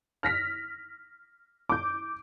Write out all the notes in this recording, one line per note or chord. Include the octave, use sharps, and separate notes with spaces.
F6 A#6 B6
D6 G6